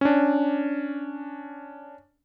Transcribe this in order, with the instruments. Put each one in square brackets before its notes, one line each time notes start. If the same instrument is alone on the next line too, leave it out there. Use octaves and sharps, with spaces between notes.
[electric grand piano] C#4 D4